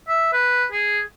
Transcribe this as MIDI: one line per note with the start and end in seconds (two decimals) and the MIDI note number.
0.08 0.30 76
0.33 0.65 71
0.71 1.00 68